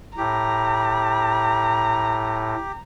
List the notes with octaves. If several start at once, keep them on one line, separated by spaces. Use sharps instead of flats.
A2 G4 A#5